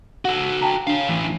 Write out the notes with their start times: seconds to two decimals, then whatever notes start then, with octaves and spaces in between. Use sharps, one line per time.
0.25 F#4 A4 F#5
0.62 G5 A5 A#5
0.87 D4 C#5 F5
1.08 A2 E3